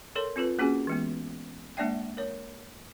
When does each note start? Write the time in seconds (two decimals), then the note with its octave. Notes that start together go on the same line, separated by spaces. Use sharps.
0.16 A4 A#4 C#5 C6
0.36 C4 F4 A4 B4
0.59 A#3 C#4 F#4 G#4 G#5
0.87 E3 G#3 B3
1.77 G#3 A#3 D4 D5 E5 G5
2.17 A#4 C#5